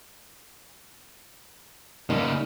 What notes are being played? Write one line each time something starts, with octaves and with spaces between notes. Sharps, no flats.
C#3 G3 A#3 D#4